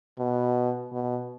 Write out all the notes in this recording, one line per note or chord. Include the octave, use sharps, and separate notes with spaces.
B2
B2